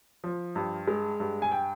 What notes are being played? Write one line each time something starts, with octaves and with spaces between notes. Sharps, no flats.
F3
G2
G#3
G2
G#5
G5